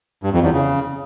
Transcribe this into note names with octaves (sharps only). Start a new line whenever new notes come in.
G2
F2
E2
C#3